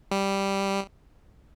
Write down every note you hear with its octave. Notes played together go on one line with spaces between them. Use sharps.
G3